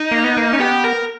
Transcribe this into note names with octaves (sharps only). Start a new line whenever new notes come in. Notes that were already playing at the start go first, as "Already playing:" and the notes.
Already playing: D#4
A#3
B3
A#3
C#4
B3 G4
A#4